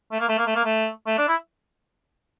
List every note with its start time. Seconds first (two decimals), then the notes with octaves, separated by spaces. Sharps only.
0.12 A3
0.20 A#3
0.28 A3
0.38 A#3
0.46 A3
0.55 A#3
0.65 A3
1.06 A3
1.18 D4
1.28 E4